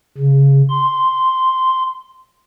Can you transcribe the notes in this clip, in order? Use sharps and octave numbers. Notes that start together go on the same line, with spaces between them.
C#3
C6